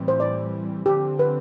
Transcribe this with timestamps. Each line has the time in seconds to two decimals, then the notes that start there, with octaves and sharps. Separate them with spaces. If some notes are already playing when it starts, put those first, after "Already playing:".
Already playing: A2 E3 G3 C4
0.08 C5
0.20 D5
0.86 D3 F3 C4 G4
1.19 B4